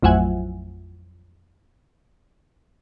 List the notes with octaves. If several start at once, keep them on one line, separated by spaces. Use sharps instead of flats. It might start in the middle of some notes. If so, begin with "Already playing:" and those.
A1 F2 F#3 E5 F#5 G#5